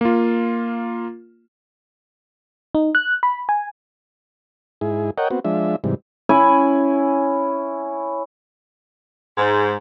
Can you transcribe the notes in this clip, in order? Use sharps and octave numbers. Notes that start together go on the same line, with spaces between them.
A#3 F4
D#4
F#6
B5
G#5
G#2 E4 G#4
A#4 C#5 D#5 F#5 G5
B3 C4 F#4
F3 G#3 D4 E5
G#2 C3 E3 G3
C#4 E4 G#5 B5
G#2